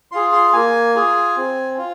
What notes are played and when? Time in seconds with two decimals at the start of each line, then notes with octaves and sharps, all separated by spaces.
0.12 F4 G#4 C6
0.32 C6
0.53 A#3 G#5
0.95 F4 G#4
1.36 C4
1.77 F4